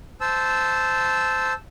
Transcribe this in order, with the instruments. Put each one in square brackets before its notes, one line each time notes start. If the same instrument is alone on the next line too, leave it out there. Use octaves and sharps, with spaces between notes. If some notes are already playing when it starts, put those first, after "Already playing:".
[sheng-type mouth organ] C5 A5 E6